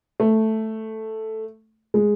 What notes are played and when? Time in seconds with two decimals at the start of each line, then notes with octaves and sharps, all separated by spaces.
0.20 A3
1.94 G#3